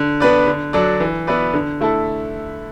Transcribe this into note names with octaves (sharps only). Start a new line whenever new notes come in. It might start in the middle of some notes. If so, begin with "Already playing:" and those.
Already playing: D3
B3 D4 B4 D5
D3
F#3 D4 A4 D5
E3
B3 E4 B4 D5
D3
A3 E4 A4